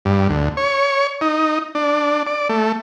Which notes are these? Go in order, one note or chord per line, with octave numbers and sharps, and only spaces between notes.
G2
D2
C#5
D#4
D4
D5
A3